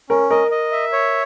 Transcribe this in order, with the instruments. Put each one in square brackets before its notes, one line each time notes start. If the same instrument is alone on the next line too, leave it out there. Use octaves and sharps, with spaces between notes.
[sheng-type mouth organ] C#4 [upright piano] A#4
[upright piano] A#4 [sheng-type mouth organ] D#5
[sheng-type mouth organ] D#5
E5
C#5